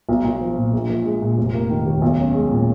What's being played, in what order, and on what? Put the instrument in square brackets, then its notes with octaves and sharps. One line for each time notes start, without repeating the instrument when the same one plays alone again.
[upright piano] B1
B1
F3
A#2
A#1
A#1
G#3
A#2
F1
A#3
D#3
D#2
B1
C#4
G#3
A#2